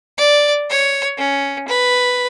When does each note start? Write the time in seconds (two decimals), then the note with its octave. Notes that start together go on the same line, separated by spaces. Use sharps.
0.18 D5
0.70 C#5
1.18 C#4
1.68 B4